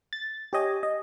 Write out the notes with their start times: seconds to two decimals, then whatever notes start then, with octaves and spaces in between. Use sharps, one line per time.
0.13 A6
0.53 G4 C#5 D#5 G#5
0.83 D#5